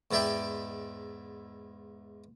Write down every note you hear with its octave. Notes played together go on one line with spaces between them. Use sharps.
E2 G#2 E4 D5 E5 G5